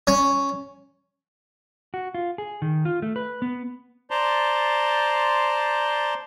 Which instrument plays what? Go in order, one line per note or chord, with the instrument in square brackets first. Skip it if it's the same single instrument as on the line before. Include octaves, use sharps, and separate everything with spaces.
[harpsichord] C#4
[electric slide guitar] F#4
F4
G#4
D#3
F4
A3
B4
B3
[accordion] C5 D5 A5 A#5 C6